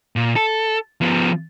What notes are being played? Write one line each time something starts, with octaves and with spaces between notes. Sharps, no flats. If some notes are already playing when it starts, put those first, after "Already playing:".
A#2
A4
F3 B3